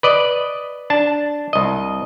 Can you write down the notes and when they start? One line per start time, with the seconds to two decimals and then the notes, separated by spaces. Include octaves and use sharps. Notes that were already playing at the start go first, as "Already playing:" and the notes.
0.03 B4 D5 D#5
0.90 D4 A5
1.53 C2 D#5